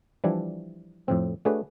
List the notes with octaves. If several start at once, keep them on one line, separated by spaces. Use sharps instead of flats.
E3 F3 G3 D4 E4
F2 A2 C4
A3 D4 F#4 G#4 B4 C#5